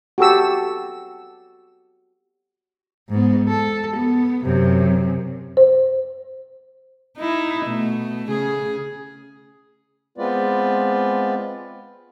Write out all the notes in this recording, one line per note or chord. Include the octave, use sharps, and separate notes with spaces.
F#4 G4 A4 E6
G#2 B3
A4
B3
F#2 C3
C5
D#4 E4
B2 A3
C#3 G#4
G#3 B3 C4 F4 B4 D5